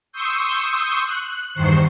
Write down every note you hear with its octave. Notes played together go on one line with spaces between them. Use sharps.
C6 C#6 D#6 E6 G6
F#6
E2 G2 D#3 C5 C#6 C7